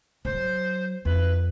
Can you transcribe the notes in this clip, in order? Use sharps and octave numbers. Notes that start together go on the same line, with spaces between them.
F#3 C5
F2 B4